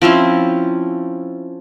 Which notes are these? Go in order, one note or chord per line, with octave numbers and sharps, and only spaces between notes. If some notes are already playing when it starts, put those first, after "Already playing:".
F3 C4 C#4 E4